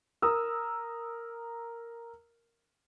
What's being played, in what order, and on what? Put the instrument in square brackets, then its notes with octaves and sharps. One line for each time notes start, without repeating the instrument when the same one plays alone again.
[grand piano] A#4 D#6 E6